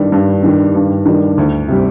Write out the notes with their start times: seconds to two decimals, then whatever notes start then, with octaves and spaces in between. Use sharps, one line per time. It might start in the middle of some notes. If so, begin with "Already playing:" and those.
Already playing: G2 D#3 G3 D4
0.12 G2
0.43 D#3 G3 D4
0.75 G2
1.06 D#3 G3 D4
1.38 D2
1.68 C3 G3